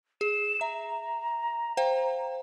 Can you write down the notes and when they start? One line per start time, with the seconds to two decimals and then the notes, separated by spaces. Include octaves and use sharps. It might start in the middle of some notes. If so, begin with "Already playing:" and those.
0.21 G#4 E7
0.61 E5 A#5
1.77 C5 F5 G5